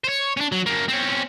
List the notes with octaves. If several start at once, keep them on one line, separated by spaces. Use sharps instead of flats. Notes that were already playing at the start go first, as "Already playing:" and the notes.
C5 C#5
C#4 D4
F#3
F#2 A#3
C4 C#4